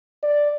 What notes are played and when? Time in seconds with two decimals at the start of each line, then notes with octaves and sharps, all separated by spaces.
0.23 D5